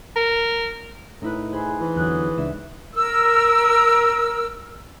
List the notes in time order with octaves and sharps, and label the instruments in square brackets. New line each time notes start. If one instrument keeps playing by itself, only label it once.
[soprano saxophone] A#4
[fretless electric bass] A2 [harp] D#4 E4 B4
[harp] G#4 C5 B5
[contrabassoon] E3
[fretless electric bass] E2 D3 F#3 [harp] D#6 F#6 G#6
[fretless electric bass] C#2 D4 [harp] E5 E6
[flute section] A#4 E6